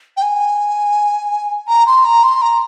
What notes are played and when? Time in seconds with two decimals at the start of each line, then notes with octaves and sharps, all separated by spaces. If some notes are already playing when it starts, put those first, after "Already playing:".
0.17 G5
0.22 G#5
1.68 A#5
1.86 C6
2.04 A#5
2.23 C6
2.41 A#5